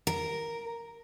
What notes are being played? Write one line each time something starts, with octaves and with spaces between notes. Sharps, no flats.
A#4